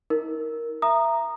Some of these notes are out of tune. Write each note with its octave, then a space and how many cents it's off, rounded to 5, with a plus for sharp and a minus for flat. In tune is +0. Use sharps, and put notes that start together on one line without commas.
D#4 +40 A#4 +0
E5 +20 A#5 +0 D#6 -20